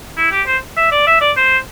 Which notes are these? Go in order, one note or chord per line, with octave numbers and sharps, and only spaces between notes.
E4
G4
C5
E5
D5
E5
D5
C5